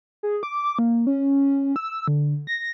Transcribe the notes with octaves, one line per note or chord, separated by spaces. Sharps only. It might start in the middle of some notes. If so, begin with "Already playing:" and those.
G#4
D6
A#3
C#4
E6
D3
A#6